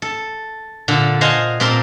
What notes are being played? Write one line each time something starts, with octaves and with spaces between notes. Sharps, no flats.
A4
A#2 D3 A4
C5 D#5 F5 F#5 G#5
A#2 C4 A#4 A5 C6